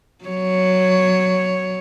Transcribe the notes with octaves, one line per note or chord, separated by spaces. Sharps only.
F#3 C#5